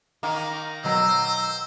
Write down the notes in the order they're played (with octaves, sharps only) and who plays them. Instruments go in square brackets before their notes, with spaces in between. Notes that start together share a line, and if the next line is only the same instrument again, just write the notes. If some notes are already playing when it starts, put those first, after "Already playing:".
[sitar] D#3 A#3
[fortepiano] B2 F#3 [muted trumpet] C5 [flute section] E6